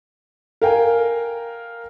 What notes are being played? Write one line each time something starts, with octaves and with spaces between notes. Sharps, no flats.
A#4 F5 G5 G#5